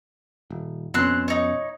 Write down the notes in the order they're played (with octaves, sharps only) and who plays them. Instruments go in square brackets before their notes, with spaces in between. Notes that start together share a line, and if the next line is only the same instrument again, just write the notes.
[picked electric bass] D#1
[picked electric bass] F2 B2 C#4 [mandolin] C4 C6 F#6
[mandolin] D#4 C#5